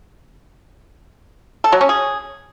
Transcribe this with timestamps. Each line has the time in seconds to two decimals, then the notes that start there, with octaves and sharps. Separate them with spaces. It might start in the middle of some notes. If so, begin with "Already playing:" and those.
1.64 A4
1.72 F#3
1.81 C#4
1.89 G#4